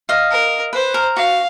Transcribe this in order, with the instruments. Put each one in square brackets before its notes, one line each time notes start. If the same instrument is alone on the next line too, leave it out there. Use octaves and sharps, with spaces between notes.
[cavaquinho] D#5 F5
[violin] A#4
[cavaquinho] B4 [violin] C5
[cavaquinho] A#4
[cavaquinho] F#4 [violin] F5